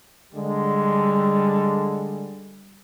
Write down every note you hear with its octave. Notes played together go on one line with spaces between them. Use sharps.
D3 G3 G#3